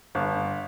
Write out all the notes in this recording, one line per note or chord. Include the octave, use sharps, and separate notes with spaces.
G1